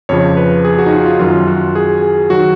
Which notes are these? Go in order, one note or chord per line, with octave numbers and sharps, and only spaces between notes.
F2 C#3 F3 C#5
B4
G#4
F#4
D#4
F4
F4
F#2 D#3 F#3 F4
F#4
G#4
G#4
D#3 F#3 F#4